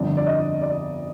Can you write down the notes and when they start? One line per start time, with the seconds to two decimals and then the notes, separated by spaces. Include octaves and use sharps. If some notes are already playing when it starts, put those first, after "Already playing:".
Already playing: G1 F2 D3 D5
0.17 D5
0.27 D#5
0.61 D5